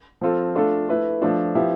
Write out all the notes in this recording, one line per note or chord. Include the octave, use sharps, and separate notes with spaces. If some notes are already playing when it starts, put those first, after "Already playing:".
F3 C4 F4 A4
A3 D4 F4 A4
A3 E4 B4
F3 A3 D4
F3 B3 E4 G4